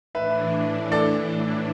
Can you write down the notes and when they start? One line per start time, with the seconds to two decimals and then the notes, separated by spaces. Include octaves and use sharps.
0.14 A2 E3 D4 B4 E5
0.92 A4 D5